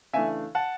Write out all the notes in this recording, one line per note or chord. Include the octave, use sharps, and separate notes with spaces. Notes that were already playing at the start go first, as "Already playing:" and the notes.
C#3 E3 A3 D4 E5 G#5
F#5 A5